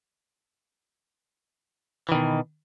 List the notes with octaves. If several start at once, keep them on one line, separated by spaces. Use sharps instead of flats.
B2 D#3 E3